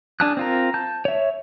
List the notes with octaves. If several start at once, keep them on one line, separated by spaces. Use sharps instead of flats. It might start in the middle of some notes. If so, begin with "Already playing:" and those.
D4 G#4 A5 F6 F#6
C4 F4 A#4
A5 G6
C#5 E5